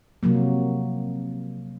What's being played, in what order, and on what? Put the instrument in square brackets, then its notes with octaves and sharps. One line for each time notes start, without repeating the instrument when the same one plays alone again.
[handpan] C3 F3 F#3 A#3